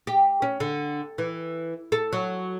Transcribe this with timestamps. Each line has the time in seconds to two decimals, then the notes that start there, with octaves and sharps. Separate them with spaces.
0.07 G4
0.42 C#4
0.60 D3
1.18 E3
1.92 A4
2.13 F#3